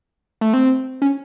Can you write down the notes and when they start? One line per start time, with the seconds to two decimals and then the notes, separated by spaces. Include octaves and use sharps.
0.41 A3
0.53 C4
1.02 C#4